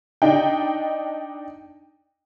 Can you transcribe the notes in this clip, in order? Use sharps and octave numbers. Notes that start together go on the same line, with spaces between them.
D4 D#4 G5